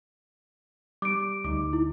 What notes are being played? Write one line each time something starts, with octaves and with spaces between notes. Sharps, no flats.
G3 D6 D7
D2 D#4 D6
E4